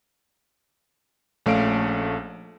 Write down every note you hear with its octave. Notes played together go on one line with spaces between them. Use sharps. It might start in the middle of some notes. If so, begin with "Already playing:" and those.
A#1 A3 C#4 F5 D7